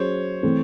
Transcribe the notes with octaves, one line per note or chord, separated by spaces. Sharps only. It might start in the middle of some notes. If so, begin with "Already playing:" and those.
Already playing: F#3 C#4 G#4 C5 C#5
E3 A3 C4